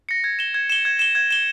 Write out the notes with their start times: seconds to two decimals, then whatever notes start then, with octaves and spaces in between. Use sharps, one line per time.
0.09 A#6 C#7
0.24 G#6
0.39 E7 G7
0.54 G#6
0.70 E7 G7
0.85 G#6
0.99 E7 G7
1.15 G#6
1.31 E7 G7